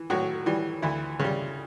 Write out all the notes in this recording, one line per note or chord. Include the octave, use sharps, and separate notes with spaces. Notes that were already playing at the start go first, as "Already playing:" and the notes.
Already playing: E3
A2 F#3 F#4
E3 G3
D2 E3 E4
C#3 G3